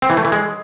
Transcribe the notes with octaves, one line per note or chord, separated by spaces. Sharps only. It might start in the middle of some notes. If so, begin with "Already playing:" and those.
C4
E3
A3
E3
G#3